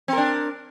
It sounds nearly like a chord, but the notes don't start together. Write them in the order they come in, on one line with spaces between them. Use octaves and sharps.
C4 A#4 D4